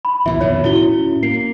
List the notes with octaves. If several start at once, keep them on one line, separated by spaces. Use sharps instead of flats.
B5
C2 A#2 E3 E5
F2 B2 D#3 C#5
A2 C#4 E4 F#4 G7
A#3 C7